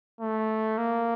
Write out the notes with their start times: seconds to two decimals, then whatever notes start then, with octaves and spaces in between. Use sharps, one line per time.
0.21 A3
0.78 A#3